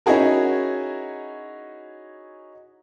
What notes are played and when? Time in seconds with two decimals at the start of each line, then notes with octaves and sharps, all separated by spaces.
0.06 C#4 D#4 E4 F#4 G#4 A#4